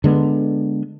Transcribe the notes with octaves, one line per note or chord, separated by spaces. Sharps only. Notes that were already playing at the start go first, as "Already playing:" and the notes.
D3 G#3 B3